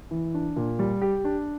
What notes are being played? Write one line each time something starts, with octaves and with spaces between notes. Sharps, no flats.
E3
D4
A#2
G3
G4
D4